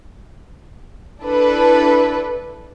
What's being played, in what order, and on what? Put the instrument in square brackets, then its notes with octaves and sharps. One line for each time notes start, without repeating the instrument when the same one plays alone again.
[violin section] D4 E4 A4 B4